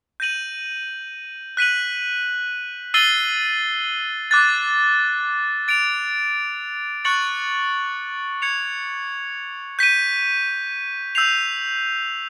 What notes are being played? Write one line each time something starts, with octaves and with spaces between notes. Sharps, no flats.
G6 A#6 D#7 F#7
F#6 B6 D#7 F#7
E6 A6 C7 D#7 G7
D6 F#6 A6
A6 D7 F7
C#6 F#6 A6 C#7 F#7
G#6 C#7 F7
G6 B6 D#7
E6 G6 C7 F7